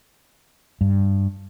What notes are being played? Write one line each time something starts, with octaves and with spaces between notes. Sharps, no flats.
G2